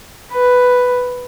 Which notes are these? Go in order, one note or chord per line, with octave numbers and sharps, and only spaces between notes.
B4